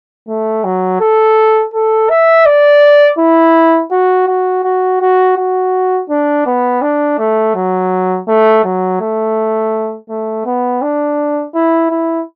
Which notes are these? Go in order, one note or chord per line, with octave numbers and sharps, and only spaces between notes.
A3
F#3
A4
A4
E5
D5
E4
F#4
F#4
F#4
F#4
F#4
D4
B3
D4
A3
F#3
A3
F#3
A3
A3
B3
D4
E4
E4